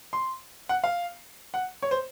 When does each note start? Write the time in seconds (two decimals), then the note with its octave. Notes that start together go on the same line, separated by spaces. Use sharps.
0.13 C6
0.69 F#5
0.84 F5
1.54 F#5
1.82 C#5
1.91 C5